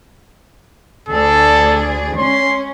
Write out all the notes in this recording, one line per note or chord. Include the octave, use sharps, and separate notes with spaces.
D2 G#4 A4 D5
G#3 C#4 C6